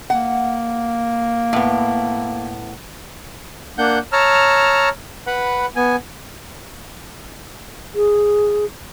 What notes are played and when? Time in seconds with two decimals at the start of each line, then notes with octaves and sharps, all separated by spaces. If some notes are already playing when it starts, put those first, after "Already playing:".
0.10 A#3 F#5
1.53 A2 B3
3.78 A#3 D4 F#5 G6
4.12 C#5 A5 A#5 E6 F6
5.27 B4 F#5 B5
5.76 B3 G#5
7.95 G#4